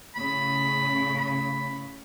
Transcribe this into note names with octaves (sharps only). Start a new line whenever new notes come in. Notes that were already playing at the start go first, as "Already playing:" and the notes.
A2 C#3 B5
B5